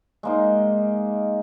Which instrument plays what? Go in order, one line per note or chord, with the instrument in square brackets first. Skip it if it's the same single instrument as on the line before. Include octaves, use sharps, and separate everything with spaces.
[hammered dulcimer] G#3 A#3 D#4